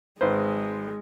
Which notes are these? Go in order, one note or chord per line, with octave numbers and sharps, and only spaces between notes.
G#1 G#3 B4 C5